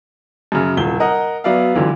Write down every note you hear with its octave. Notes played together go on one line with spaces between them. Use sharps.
F#2 C#3
D#1 C2 G7
A#4 D#5 F#5
F#3 B3 D5 E5 F5
C#2 D3 E3 F#3